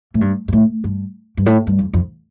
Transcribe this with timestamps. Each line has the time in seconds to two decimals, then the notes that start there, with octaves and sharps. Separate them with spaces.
0.14 A2
0.21 G2
0.48 G2
0.53 A2
0.84 G2
1.37 G2
1.46 A2
1.67 G2
1.79 F2
1.93 F2